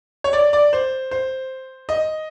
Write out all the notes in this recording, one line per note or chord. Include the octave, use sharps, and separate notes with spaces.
C#5
D5
D5
C5
C5
D#5